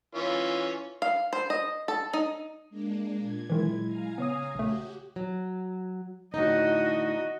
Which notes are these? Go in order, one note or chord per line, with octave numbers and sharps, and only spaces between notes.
E3 C#4 F4
F5
C5
D#5
A4
D#4
G#3 A#3 D4
A#2 G#6
D#3 E3 F#3 G#3 E4
F5 G#5 A#5
C#3 B3 C#5 D#6
A#1 A3 F#4 G4
F#3
A2 D3 D#4 F#4 D#5